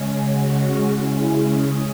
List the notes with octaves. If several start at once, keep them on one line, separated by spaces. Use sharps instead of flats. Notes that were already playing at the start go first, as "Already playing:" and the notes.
Already playing: C#3 G#3 C#4
F#4
F#4
E4
G#4